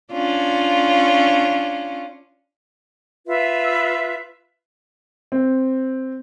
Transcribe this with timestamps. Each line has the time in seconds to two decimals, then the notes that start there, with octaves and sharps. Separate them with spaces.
0.12 C#4 D4 F4
3.26 F4 B4 E5
5.32 C4